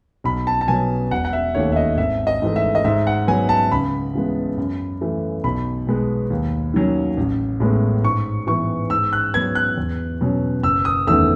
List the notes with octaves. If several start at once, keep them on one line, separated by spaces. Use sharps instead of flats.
B1 B5
A5
A5
B2 F#3 B3 G#5
E1 F#5
F#5
E5
D#2 D#3 A3 C#5
E5
D#5
G#1 E5
D#5
G#2 E3 A3
E5
D#5
G#2 E5
F#5
F#3 B3 G#5
A5
C#2 B5
C#3 E3 G#3 B3
F#2
E3 A3 C#4
B1 B5
B2 G#3 B3
D#2
D#3 F#3 C#4
A1
A2 G#3 B3
G#2 C#6
E3 B3 C#6
G#2 E6
F#6
F#3 B3 G#6
F#6
E2
B2 F#3 C#4
F#1 E6
D#6
E2 D#3 A3 C#4 E6